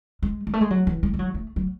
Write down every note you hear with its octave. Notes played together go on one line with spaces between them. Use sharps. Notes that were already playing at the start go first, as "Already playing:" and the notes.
G#3
G#3
A3
G#3
F#3
E3
G#3
G#3
F#3
A3
F#3